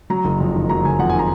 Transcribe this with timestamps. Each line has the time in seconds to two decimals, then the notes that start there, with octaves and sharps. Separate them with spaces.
0.10 F#3 A#5
0.25 F#1
0.40 F2
0.55 D#3
0.70 F#3 A#5
0.85 F#1 G#5
0.99 F2 F#5
1.10 G#5
1.14 D#3
1.19 A#5